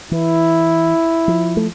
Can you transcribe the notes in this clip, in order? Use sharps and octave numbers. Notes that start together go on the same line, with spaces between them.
E3 E4
F3
A3